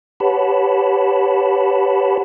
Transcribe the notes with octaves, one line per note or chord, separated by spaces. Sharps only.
G4 B4 C#5 F#5 A5 B5